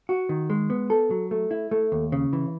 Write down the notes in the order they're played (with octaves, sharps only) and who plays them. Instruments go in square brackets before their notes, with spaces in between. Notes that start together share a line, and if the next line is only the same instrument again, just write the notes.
[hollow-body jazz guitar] F#4
D#3
G#3
B3
A4
F#3
A3
E4
A3
D#2
C#3
E3